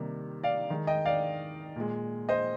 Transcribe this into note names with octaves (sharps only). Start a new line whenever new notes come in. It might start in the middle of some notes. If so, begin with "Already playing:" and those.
Already playing: C3 D#3 G3 A#3
D5 F5
D#3 G#3
D#5 G5
D5 F5
A#2 G#3
C5 D#5